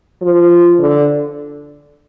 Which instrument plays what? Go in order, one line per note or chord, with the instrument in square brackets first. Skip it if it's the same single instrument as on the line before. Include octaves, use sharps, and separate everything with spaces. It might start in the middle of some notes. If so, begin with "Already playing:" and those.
[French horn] F3
D3